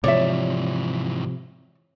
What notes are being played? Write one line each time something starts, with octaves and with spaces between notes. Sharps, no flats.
G#2 C3 E3 F3 C#5 D5 E5